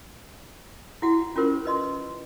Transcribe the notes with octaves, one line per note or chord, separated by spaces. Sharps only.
E4 F#4 F#5
C#4 F4 G4 A#4 C5
B4 D#5 C6